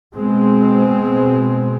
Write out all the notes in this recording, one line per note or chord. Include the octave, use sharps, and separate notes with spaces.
B2 G#3 C4